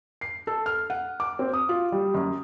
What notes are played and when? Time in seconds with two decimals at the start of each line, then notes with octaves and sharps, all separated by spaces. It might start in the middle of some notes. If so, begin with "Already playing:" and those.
0.21 C7
0.47 A4
0.66 F6
0.90 F#5
1.20 D6
1.39 C4
1.53 D#6
1.69 F4
1.92 G3
2.14 F#2